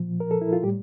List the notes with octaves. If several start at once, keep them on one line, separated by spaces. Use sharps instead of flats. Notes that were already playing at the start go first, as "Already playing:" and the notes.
Already playing: A#2 F3
A#4
A4
E4
F4
A2 G3 G4